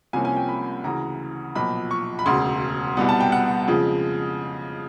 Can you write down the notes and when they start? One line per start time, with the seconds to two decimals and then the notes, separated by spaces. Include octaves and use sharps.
0.13 C2 C3 F3 A#3 C#4 G#5
0.25 G#5
0.37 G5
0.48 B5
0.84 D2 C#3 E3 A#5
1.55 B1 A#2 F3 B5
1.91 C#6
2.19 B5
2.26 E1 D2 C#3 C6
2.97 C2 B2 G3 B3
3.09 A5
3.20 G5
3.32 F#5
3.68 F2 C#3 F3 G#3